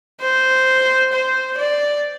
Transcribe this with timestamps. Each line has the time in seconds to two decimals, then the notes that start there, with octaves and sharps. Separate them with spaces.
0.21 C5
1.13 C5
1.58 D5